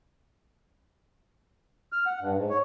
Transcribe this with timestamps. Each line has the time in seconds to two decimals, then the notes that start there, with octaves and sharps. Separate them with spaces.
1.93 F6
2.06 F#5
2.21 G2
2.37 G#2
2.50 C#5